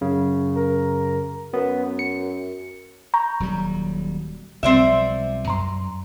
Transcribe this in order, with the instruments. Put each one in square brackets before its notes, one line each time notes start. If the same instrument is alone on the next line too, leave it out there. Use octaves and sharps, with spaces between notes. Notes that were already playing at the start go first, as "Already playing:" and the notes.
[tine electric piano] F#2 C#3
[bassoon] A#4
[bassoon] F#2 [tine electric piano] B3
[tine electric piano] C#7
[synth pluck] A#5 C#6 G6
[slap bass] D#1 F#3 G3
[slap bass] B1 F3 G3 [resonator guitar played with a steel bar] C4 D5 E5
[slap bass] F#2 [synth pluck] A#5 C6